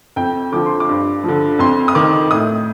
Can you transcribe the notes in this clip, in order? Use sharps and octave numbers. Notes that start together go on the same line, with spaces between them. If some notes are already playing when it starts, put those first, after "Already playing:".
F2 G5
D3 F3 D6
C6
D6
G2
D3 F3
F2 C6
D#6
D#3 D6
A2 D#6